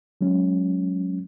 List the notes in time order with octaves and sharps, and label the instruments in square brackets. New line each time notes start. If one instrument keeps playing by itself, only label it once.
[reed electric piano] F#3 G#3 C#4